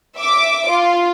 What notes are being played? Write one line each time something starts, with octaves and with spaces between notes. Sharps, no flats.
E5 D6
F4